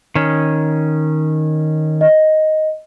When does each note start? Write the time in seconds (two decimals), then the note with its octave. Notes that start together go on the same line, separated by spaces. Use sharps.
0.15 D#3 C#4
2.01 D#5